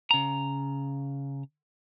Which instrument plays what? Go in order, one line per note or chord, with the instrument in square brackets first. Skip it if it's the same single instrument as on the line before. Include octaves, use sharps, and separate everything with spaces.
[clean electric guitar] C#3 A#5